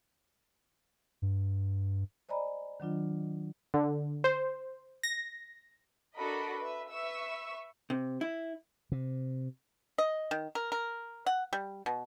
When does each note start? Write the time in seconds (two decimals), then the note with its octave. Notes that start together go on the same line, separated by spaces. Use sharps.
1.22 G2
2.29 C5 D5 D#5 G#5 A#5 B5
2.80 D#3 F#3 D4 F4
3.74 D3
4.24 C5
5.03 A#6
6.15 D4 F#4 A4 A#4 D#5 B5
6.59 B4 E5
6.91 B4 E5 C#6 E6
7.90 C3
8.21 E4
8.92 C3
9.98 D#5
10.31 D#3
10.55 A#4
10.72 A#4
11.26 F#5
11.53 G3
11.86 B2